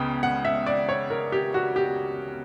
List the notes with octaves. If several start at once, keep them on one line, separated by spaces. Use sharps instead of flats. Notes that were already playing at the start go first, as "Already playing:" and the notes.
Already playing: C#2 C#3 B3 G5
F#5
E5
D5
C#5
A#4
G4
F#4
G4